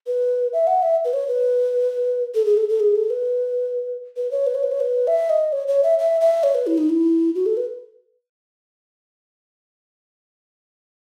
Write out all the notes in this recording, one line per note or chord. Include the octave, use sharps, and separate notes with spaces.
B4
E5
F#5
E5
B4
C#5
B4
A4
G#4
A4
A4
G#4
A4
B4
B4
C#5
B4
C#5
B4
C#5
B4
E5
D#5
C#5
C#5
E5
E5
E5
C#5
B4
E4
D#4
E4
F#4
A4
B4